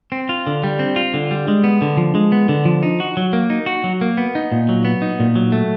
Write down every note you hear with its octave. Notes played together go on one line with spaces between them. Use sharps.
C4
F4
D3
G3
C4
F4
D3
G3
G#3
B3
D3
F3
G#3
B3
D3
F3
D#4
F#4
F#3
A#3
D#4
F#4
F#3
A#3
B3
D#4
A#2
F#3
B3
D#4
A#2
F#3
A3